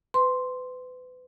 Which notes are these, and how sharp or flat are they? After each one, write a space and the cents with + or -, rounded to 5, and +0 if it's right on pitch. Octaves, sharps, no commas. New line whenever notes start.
B4 +35 C6 +0